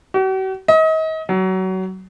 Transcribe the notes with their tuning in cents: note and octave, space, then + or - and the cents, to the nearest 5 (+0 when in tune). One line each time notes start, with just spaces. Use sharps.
F#4 +45
D#5 +35
F#3 +25